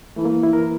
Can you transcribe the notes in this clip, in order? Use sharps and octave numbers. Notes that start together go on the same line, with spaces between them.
E3 A3
A#3
E4
E3 A#4